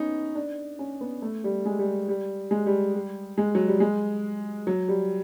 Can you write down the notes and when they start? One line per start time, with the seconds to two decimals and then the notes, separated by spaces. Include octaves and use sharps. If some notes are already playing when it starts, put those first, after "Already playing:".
Already playing: B3 C#4 D#4
0.35 D4
0.79 C#4
1.01 B3
1.22 A3
1.44 G3
1.66 G#3
1.79 G3
2.08 G3
2.51 G#3
2.66 G3
2.95 G3
3.38 G#3
3.55 F#3
3.68 G3
3.80 G#3
4.67 F#3
4.89 G3